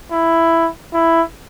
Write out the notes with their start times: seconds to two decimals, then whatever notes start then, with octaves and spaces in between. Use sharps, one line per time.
0.12 E4
0.94 E4